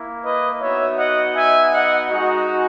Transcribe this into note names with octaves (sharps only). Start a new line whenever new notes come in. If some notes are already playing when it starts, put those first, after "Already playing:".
Already playing: A#3 E4
B4 D#5
B3 D#4 F#4 C#5 E5
D#5 F#5
E5 G#5
D#5 F#5
G#3 D#4 F#4